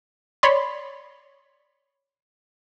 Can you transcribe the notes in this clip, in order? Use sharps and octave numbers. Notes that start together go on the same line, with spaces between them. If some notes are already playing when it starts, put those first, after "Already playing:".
C#5 D5 B5 C6